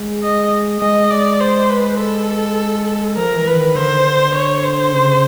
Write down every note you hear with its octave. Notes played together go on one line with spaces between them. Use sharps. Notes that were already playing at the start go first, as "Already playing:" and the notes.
Already playing: G#3
D#5
G#3 D#5
D5
C5
B4
A4
F3 A#4
E3
B4
D#3
D3 C5
C#5
C5
C#3